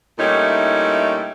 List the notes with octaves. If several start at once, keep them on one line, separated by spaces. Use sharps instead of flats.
A#2 G3 A3 C#4 D#4 E4